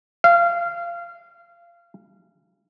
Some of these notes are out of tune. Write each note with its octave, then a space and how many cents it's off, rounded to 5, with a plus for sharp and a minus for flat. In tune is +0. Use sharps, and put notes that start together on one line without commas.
F5 -25